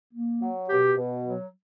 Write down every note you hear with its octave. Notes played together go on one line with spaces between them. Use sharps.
A#3
F#3
B2 G4
B2
F#3